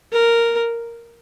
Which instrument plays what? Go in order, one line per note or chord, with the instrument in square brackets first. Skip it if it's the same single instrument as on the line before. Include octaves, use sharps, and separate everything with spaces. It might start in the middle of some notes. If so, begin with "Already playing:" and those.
[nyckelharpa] A#4